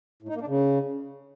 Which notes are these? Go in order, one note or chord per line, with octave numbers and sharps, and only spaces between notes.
A2
D#4
A#3
D4
C#3